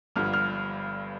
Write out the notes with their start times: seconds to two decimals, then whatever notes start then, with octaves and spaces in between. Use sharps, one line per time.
0.16 G1 G2 D3 F3 F6
0.33 F6